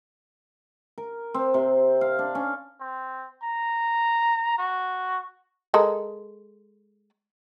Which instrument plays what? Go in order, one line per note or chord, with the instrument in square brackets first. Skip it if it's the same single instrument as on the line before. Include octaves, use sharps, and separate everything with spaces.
[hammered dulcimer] A#4
C4
C3
F5
D4
C#4
[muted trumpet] C4
A#5
F#4
[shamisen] G#3 A4 A#4